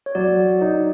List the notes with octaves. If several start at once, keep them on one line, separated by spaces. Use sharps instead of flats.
C#5
F#3 D5
D#4